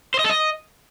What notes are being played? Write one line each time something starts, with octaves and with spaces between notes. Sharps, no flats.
C5
D#5
A4
D#5